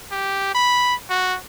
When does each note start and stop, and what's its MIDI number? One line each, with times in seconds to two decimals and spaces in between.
0.12 0.55 67
0.55 0.95 83
1.10 1.37 66